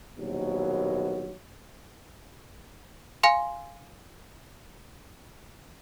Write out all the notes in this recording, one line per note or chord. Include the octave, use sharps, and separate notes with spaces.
A#1 D#2 B2 F#3
F5 G#5 C6